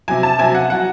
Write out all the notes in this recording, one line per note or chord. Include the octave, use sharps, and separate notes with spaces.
C3 F#3 G#5
A5
C3 F#3 G#5
F#5
F#3 F#5